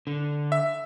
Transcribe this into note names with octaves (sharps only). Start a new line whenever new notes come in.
D3
E5